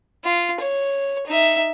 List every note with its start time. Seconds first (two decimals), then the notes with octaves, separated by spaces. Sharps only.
0.24 F4
0.60 C#5
1.27 D#4 E5